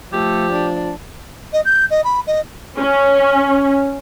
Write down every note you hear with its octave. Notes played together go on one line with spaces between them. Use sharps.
F3 A3 G4
D4
D#5
G6
D#5
B5
D#5
C#4